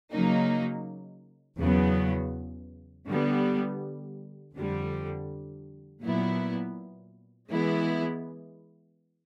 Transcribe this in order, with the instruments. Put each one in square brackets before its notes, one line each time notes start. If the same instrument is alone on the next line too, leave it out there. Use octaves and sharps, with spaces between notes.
[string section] C#3 F#3 A#3 D#4
E2 C#3 F#3 B3
D3 G3 B3
F2 D3 G3
A#2 F#3 B3 E4
E3 G#3 B3 E4